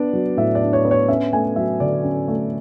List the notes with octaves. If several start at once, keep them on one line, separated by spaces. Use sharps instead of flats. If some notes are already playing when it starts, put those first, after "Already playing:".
Already playing: B3 D4 D5
F#3
A2 E5
D5
D4
C#5
B3
C#5
C#4 E5
A3 G#5
F#3 E5
D3 D5
C#4
A3